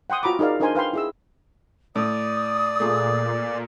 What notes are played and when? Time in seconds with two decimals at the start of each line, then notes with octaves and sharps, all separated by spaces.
0.10 F#5 G5 C6 D#6
0.23 F4 F#4 A#5 B5 D6
0.39 D#4 G#4 A#4 D5 F5
0.60 D4 D#4 A#4 C5 G#5 C6
0.75 B4 F5 G5 C6
0.93 E4 G#4 E6
1.96 A2 D5 D#6
2.80 A#2 A3 G#4